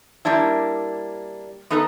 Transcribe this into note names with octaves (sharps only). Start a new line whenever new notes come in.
G3 A#3 D4 E4
B3 D#4 A4 B4 A#5